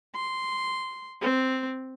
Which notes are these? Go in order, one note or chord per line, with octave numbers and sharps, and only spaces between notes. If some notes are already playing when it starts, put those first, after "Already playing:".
C6
C4